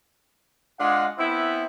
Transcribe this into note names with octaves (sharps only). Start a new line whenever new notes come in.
G#3 D4 F4 F5 F#5
B3 C4 E4